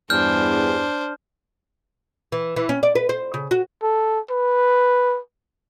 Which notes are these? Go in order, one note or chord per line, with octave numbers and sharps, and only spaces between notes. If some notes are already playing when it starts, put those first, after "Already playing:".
E2 G2 D4 C5 F6 G6
E3
E3
C#4
D5
B4
C5
C#3
F#4
A4
B4